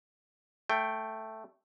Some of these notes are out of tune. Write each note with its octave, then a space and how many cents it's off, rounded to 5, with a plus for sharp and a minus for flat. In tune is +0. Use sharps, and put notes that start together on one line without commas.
A3 +0 G5 +0